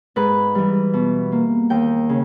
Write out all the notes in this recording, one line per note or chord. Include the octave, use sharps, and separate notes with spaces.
G#2 B4
E3 G3
B2
A#3
D#2 G5
C#3